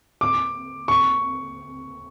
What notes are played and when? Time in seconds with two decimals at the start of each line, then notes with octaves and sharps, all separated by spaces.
0.21 D6
0.88 C#6